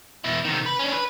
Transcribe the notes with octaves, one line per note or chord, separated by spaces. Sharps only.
B2 E4
C3 D#3
B4
C#4 D4
B4